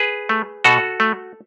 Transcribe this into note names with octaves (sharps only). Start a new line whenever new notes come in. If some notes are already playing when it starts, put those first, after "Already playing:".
Already playing: G#4 B4
A3
B2 F#4 A4
A3